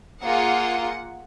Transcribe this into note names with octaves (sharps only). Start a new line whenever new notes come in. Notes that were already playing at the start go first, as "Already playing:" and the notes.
A#3 F4 G#4 F#5